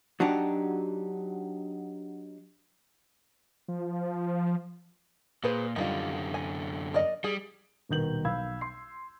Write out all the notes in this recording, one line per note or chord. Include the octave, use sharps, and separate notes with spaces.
F#3 D4 D#4 F#4 G4
F3
A#2 G#4 B4 C5
F#2 D3 D#3 G3 F4
G#5
A#4 D5 D#5
G3 G#4
D#1 B2 D#3 G6 F#7
B1 F5 B5 E6 G#6
C6 C7